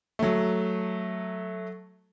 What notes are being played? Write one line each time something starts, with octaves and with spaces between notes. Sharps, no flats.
F#3 A3